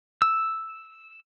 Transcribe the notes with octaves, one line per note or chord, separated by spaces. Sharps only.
E6